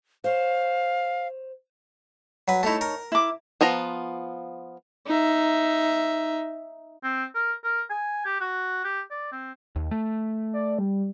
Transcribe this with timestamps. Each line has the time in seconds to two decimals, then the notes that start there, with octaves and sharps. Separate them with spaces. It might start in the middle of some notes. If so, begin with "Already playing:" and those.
0.24 C5 C#5 F5
2.48 F#3 B4
2.63 A3 D#4 E4 C#5 A5
2.81 A#4
3.12 E4 D6
3.61 F3 B3 F4 A#5
5.06 D#4 E5
7.03 C4
7.35 A#4
7.64 A#4
7.90 G#5
8.25 G4
8.40 F#4
8.84 G4
9.11 D5
9.32 C4
9.76 D#2
9.91 A3
10.53 D5
10.79 G3